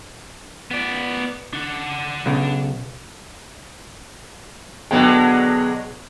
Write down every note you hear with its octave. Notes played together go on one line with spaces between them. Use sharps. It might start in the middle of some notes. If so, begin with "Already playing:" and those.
B3 D5
D4 F#5
B1 C#3
B1 D3 F#3 G#3 B3 G5